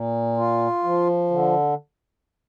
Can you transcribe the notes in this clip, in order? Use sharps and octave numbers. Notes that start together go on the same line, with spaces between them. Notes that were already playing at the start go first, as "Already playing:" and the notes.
Already playing: A#2
F4
F3
D3